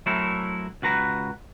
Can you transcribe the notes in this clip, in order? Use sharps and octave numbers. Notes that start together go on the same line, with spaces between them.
F#3 A3 C4 E4 A4 A#4
C#2 F#4 B4 A#5